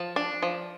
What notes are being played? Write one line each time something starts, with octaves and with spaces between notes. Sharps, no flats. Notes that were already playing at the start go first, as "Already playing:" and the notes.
Already playing: F3 A5
D4
F3